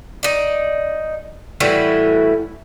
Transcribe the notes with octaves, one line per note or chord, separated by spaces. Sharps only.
D#4 D5
A2 E3 G3 F#4